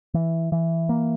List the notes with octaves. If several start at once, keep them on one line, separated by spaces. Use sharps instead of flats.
E3
E3
A#3